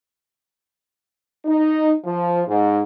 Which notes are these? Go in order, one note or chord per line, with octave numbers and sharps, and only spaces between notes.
D#4
F3
G#2